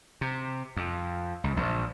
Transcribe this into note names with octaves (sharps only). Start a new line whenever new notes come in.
C3
F2
C#2
A#1